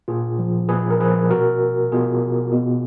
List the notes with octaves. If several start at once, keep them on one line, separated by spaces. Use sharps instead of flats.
A#2 F4 G#4
F3
A#2 G#4 B4
A#4
F3 G#4 B4
B2 F#4 A#4
B2 F4 G#4
B2